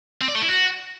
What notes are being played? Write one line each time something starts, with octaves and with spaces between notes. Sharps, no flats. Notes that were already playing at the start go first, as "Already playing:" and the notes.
C4
D5
A3
E4
F#4